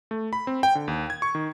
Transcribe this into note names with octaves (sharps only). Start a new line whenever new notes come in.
A3
B5
C4
G5
D3
D#2
G#6
C#6
D#3